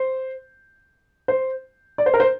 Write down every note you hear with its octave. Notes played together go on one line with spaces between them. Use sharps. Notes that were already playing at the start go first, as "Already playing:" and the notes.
Already playing: C5
C5
D5
C5
A#4
C5